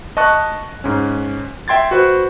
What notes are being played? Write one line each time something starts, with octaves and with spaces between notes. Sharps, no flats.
D#5 A5 C#6 F#6
G#2 C#4
E5 G5 C6 G#6 A6
F#4 B4 C5